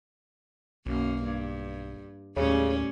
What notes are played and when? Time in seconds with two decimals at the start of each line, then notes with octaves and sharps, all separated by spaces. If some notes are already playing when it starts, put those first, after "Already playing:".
0.86 B1 F#2 A#3
1.23 G2
2.36 D#2 A2 C#3 G3 C#4